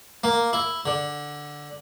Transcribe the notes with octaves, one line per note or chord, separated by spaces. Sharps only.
A#3
E4
D3